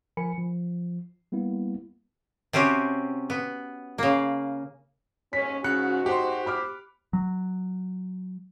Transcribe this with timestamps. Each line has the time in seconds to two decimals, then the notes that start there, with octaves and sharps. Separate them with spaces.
0.17 F3 A#4 G#5 B5 C#7
0.38 F3
1.32 G3 A#3 B3 E4
2.53 C3 C4 C#4 F#4 G4
3.30 B3
3.98 C#3 A#3
5.33 D#2 G#2 C#4 B6
5.64 G#2 C#3 F#4 F#6 C#7
6.06 G4 C5 F#5 C6
6.46 B5 D6 F6
7.13 F#3